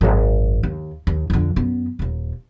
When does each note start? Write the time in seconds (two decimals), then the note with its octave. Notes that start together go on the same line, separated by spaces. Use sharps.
0.01 G#1 F#2
0.63 D#2
1.07 D#2
1.30 F2 D3
1.56 F#2 B3
1.99 D#1 D#2